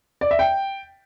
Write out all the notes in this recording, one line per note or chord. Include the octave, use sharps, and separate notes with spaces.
D5
E5
G5